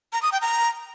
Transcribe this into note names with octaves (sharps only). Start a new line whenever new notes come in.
A#5
D#6
G5
A#5